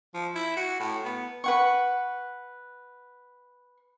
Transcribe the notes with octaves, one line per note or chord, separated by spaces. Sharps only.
F3
E4
F#4
A2
B3
B4 F#5 C#6